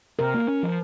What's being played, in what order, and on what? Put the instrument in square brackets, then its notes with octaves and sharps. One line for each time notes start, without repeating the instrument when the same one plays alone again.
[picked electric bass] C3 [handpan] A#4
[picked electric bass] A#3
C#4
F3